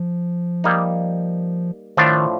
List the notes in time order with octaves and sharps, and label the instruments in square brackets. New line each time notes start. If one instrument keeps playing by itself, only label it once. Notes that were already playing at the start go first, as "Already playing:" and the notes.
Already playing: [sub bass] F3
[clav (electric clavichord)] G3 A#3 D#4
[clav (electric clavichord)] A2 F3 A3 D4 F4 [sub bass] D#3